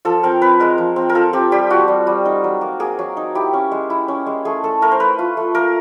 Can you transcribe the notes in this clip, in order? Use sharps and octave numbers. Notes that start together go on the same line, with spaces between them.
F3 A4
C4 A#4
C4 B4
G#3 A#4
F3
C4
A#4
F4 A4
C4 G4
G3 G4
F4 F#4
G3
G3
D#4
F#3
A#3
A#3 G#4
F#3
D#4
E4 G4
C#4
G#3
E4
C#4
G#3
A3 G#4
A3 A4
A3 A#4
C5
A3 B4
F4
A3
A#3 A#4